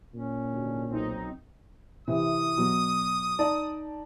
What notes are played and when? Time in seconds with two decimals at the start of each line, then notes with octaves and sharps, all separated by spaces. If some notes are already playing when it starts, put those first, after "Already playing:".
0.14 A#2 C#4
0.51 G#1 D2 D4
0.89 B1 C4 D#4
2.08 C3 E3 D#6
2.57 B2 F#3
3.39 D#4 D5 A5